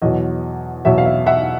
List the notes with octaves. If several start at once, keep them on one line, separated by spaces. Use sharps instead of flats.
E2 B2 F#3 D#5
E2 B2 F#3 E5
F5
E5
E5 F#5